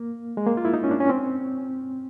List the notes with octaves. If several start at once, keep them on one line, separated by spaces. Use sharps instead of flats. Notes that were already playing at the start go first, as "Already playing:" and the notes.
Already playing: A#3
G#3
A#3
F4
E4
D#4
C#4
D4
C#4
C4